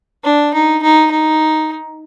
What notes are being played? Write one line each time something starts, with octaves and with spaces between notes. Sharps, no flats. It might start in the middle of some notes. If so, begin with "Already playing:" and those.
D4
D#4
D#4
D#4